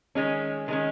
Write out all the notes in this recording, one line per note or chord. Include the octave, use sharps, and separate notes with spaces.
D#3 G#3 C#4
D#3 G#3 C#4